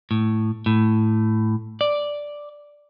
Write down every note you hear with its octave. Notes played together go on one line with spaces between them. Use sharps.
A2
A2
D5